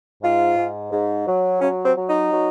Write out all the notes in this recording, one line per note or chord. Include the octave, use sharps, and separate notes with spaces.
G#2 F4
G#2
G#2
F#3
F#3 C#4
C4
F#3
D#4
F#3